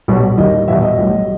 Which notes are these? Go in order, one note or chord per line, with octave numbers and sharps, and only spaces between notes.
B1 B2 G3
D#2 D#3 G3 D#5
E2 B2 G3 E5
D#5
B1 A2 G3